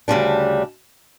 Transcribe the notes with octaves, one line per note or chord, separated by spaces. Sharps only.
D2 C#3 G3 D4